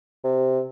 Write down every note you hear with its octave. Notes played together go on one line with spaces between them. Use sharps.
C3